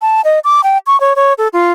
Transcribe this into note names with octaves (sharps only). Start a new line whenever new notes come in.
A5
D#5
D6
G5
C#6
C#5
C#5
A4
F4